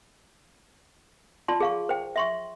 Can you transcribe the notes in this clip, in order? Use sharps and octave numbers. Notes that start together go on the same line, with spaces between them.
F4 D5 A5 C6
G#4 F5 C#6
C5 G5
E5 C6 C#6